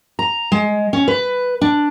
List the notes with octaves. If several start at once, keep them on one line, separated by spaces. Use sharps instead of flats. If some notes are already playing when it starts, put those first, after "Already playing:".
A#5
G#3
C#4
B4
D4